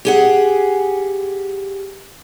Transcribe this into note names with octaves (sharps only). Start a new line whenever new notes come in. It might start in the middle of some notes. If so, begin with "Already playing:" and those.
G4 G#4 F#5